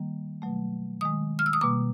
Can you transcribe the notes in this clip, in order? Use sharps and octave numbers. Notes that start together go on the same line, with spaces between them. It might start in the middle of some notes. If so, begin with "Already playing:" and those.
Already playing: D#3 G3 A#3
B2 F#3 A3
D#3 G#3 D#6
F6
E6
D#6
B2 G3 A#3 D6